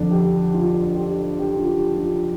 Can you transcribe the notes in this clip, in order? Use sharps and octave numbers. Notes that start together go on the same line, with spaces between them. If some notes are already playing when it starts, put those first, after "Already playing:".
Already playing: F2 D3 D4
G4
F4
G4
G4
F4
G4
F4